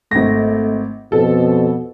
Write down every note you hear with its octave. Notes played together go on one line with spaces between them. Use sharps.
G#1 A3 A#6
F2 B2 A4